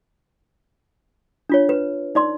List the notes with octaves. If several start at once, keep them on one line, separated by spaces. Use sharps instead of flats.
D4 F4 C#5
B4
D#4 D5 C6